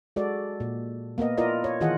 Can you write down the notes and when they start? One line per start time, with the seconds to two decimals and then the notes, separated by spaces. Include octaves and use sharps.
0.16 G#3 F#4 A4 D5
0.60 A#2
1.18 A#3 B3 A#4 D#5
1.38 E4 F4 A#4 D5 D#5
1.64 C#5
1.81 D#3 E3 F4 G#4 D#5 F#5